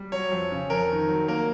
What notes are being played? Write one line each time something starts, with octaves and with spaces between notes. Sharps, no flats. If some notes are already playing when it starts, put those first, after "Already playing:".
Already playing: G3
F#3 C#5
F2
C#3
F2 A#4
D#3
F#3
A#3 A#4